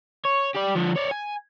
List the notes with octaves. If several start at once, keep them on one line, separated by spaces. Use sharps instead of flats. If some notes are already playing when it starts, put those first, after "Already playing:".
C#5
G4 D5
D3 F3
C#5 D5
G#5